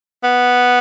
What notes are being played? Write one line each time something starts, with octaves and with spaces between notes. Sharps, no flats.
B3